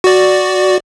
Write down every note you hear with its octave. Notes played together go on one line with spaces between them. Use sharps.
F#4 D5